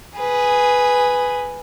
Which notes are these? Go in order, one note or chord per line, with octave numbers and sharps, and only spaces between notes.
G#4 B4